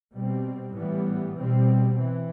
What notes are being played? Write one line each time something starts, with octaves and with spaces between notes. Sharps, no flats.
B2 G3 C4
A2 E3 G3 B3
B2 G3 C4
E3